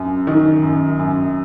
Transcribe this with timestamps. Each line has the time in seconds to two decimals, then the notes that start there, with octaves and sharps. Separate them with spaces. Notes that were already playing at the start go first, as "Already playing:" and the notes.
Already playing: F#2
0.27 D#3
0.63 F#2
0.99 F#2